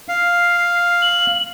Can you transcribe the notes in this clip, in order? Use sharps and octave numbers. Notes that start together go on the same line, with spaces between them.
F5 C7
F#7